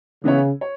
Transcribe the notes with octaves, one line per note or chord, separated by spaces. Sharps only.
C#3 E3 B3 E4 C#5
C#5